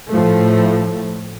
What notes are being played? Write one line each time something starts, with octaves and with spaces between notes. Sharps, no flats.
A2 F3 A3